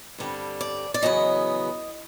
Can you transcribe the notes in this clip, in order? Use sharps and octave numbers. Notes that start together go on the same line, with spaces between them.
G2 D3 G3 C4
D5
D5
E2 C#3 F#3 B3 D#5